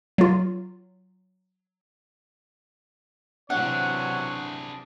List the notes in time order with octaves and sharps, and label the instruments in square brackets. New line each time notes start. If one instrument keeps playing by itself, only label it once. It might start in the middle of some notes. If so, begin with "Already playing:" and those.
[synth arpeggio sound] F#3 F4
[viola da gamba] C3 E3 F#3 [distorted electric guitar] D4 G#4 [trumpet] C#5 [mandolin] F#5